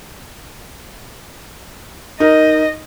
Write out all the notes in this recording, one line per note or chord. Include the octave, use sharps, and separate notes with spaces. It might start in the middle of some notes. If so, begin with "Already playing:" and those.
D#4 A#4 D#5